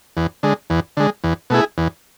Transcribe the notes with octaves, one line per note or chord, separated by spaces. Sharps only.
E2
D3 G#3
E2
D3 G#3
E2
B2 A3 E4 G#4
E2